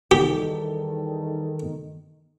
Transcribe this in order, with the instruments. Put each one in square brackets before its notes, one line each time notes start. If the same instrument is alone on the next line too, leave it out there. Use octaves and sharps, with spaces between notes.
[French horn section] E2 G3 A4 [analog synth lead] D#3 [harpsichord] G4